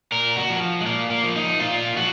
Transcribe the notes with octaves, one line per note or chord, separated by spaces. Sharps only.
A#2 A#4
F#4
F3
G#3
A#2 A#3
A#3
F3
D#4
A#2 F4
F3 F#4